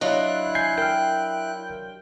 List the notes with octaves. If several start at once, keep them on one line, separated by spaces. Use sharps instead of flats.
F#3 D4 E4 F4 D#5 F#6
G#5 G6 C7
A#4 G5 F6